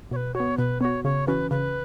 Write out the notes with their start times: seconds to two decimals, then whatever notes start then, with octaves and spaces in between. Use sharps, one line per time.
0.11 B2 C#5
0.16 B4
0.34 F#4 C#5
0.40 B3
0.58 B2 B4
0.81 B3 F#4 C#5
1.04 C#3 C#5
1.27 E3 C#4 F#4 B4
1.51 C#3 B4